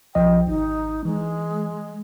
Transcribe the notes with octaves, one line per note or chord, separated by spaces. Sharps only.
B1 F3 D#5 G5
G#1 D#4
E3 G#3